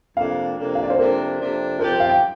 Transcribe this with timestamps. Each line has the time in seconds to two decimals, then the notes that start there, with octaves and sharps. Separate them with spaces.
0.17 F2 C3 A#3 D4 F5
0.57 F2 C3 A#3 D4
0.75 F5
0.83 D5
0.90 C5
0.98 F2 C3 A#3 D4 A#4
1.39 F2 C3 A#3 D4
1.79 F3 C4 G4 A#4
1.90 A#4
2.00 F5
2.09 G5